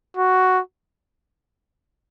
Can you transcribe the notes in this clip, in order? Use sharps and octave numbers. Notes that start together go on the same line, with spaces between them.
F#4